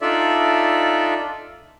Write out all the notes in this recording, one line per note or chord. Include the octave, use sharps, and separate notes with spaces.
D4 D#4 F4 A4 D5 E5